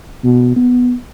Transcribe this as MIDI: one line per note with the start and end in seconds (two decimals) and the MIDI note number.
0.24 0.54 47
0.56 0.93 59